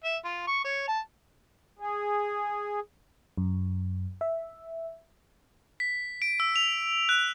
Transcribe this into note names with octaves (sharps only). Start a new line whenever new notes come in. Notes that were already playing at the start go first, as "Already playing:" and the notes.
E5
F4
C#6
C#5
A5
G#4
F#2
E5
B6
D7
E6
F7
F#6